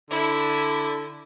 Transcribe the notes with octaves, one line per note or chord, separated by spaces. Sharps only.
D3 E4